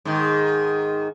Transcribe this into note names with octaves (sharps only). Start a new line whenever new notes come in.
G#2 D#3